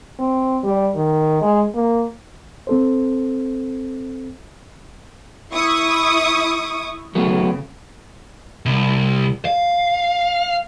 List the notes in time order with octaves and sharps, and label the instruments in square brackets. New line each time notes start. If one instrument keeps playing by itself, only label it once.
[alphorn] C4
G3
D#3
G#3
A#3
[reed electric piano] C4 A4 C5
[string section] E4 C#6 D#6
[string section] C#3 [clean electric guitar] F#3 A3 B3
[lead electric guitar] C2
F5